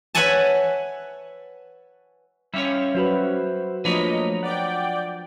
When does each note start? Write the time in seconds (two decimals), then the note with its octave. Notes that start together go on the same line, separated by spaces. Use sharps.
0.15 B4 C#5 E5 F#5 G#5 A5
2.54 G3 C#4 E4 C#5 E5 F5
2.95 F#3 F#4 B4 C5 E5 B5
3.85 F3 A3 A#3 D4 B4 C#5 D#5 A#5
4.43 D5 F#5 G5